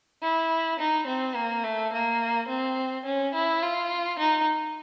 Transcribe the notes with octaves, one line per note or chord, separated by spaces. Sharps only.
E4
D#4
C4
A#3
A3
A#3
C4
C#4
E4
F4
D#4